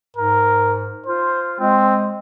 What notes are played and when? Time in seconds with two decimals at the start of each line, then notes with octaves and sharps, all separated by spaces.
0.17 G#2 A#4
1.06 F4 C5
1.60 G#3 C4